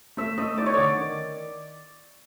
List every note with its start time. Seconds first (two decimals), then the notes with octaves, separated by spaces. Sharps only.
0.17 A3 E5
0.38 A3 D#5
0.58 D#4 D5
0.66 C#5
0.74 D3 D5
0.97 D#3